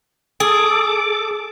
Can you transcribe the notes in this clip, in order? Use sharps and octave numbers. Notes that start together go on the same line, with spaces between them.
G#4 A4 D6